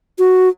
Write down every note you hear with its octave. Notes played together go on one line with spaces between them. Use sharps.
F#4